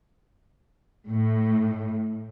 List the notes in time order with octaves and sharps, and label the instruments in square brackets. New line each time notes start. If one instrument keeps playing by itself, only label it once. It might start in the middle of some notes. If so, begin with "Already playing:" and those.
[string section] A2